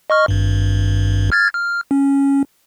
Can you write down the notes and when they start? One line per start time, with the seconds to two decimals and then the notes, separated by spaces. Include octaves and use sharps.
0.10 D#5 C#6 F6
0.28 G#1 G2
1.32 F6 G#6 A6
1.54 F6
1.91 C#4